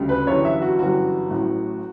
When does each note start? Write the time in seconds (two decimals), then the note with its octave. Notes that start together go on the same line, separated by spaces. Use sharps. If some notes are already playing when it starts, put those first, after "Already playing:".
Already playing: D2 C#3 G3
0.09 B4
0.26 G1 F#2 E3 G3 C#5
0.45 E5
0.61 F#4
0.79 G1 F#2 E3 G3 F#4
1.30 A1 A2 F#3